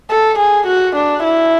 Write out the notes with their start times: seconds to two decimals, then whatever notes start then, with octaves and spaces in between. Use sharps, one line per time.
0.10 A4
0.39 G#4
0.67 F#4
0.95 D4
1.24 E4